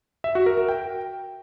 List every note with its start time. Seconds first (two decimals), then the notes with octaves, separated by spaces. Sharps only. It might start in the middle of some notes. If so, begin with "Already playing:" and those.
0.24 E5
0.35 F#4
0.46 A#4
0.57 A#4
0.68 G5